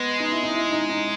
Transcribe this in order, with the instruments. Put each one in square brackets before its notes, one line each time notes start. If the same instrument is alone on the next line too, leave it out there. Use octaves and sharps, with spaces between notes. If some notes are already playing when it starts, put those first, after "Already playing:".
Already playing: [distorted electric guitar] G#3 [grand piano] B3
[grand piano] D#4
E4
D#4
E4
D#4
D#4